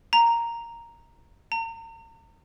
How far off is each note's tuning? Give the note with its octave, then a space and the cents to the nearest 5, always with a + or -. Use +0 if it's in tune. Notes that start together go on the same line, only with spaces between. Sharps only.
A#5 -5
A#5 -40